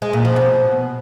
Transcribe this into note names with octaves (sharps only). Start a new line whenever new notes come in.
G#3
A#2
F3
B2